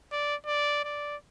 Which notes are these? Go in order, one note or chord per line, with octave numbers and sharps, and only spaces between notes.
D5
D5
D5